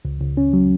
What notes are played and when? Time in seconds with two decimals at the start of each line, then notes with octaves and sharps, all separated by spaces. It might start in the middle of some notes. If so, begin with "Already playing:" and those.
0.05 C#2
0.21 C#2
0.37 C#4
0.53 F#3